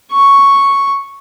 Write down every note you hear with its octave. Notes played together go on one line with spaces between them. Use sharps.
C#6